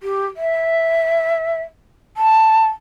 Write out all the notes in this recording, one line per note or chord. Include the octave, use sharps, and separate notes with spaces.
G4
E5
A5